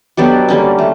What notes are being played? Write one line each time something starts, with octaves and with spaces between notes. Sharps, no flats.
B2 F#3 B3 D4 G4 A4
D3 G3 A#3 C#4
A3